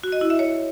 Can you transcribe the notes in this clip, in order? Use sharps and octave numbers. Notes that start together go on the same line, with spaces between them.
F#4
D#5
E4
E5
C#5